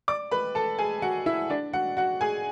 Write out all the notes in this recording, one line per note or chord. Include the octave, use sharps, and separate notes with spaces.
D5 D6
B4 B5
A4 A5
G#4 G#5
F#4 F#5
E4 E5
D4 D5
F#4 F#5
F#4 F#5
G#4 G#5